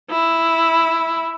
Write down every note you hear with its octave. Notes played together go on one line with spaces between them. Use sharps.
E4